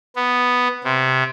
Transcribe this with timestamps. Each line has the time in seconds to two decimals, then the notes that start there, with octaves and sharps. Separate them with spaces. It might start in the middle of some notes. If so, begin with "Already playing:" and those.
0.16 B3
0.84 C3